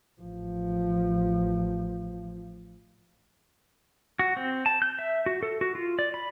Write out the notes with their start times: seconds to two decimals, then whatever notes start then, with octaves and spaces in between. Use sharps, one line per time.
0.21 A1 F3
4.19 F#4
4.37 C4
4.66 A5
4.82 G6
4.99 E5
5.26 F#4
5.43 A4
5.61 F#4
5.75 F4
5.99 D5
6.14 B5